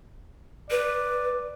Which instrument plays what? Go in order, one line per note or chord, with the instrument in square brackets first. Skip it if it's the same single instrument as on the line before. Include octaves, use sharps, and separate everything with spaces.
[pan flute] B4 [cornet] D5